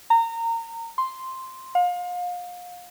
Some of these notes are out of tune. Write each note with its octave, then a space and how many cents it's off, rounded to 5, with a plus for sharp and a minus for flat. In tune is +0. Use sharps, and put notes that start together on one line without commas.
A#5 -25
C6 +0
F5 +35